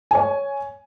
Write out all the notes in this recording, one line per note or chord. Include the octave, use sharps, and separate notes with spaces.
C#5 G#5